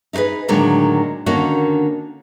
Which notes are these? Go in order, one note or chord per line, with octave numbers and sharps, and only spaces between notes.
D#4 E4 G4 G#4 B4
A2 D3 D#3 F#3 G#3 A#3
D3 D#3 A#3 C#4 D#4 F#4